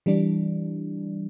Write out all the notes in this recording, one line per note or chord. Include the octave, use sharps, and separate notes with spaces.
E3 G3 D4